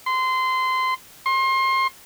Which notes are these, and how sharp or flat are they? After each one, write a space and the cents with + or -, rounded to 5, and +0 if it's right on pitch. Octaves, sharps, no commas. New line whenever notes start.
C6 -20
C6 +30